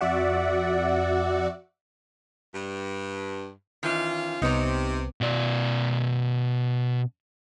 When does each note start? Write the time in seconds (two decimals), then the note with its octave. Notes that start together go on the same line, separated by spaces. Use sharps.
0.01 F2 F#4 D5 E5 F#5
2.53 G2
3.83 D#3 E3 C#4 F4
4.42 C2 C3 B3 D#4 C#5
5.21 B2 D5